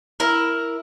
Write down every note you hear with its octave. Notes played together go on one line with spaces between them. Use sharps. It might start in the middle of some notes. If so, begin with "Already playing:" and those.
E4 A#4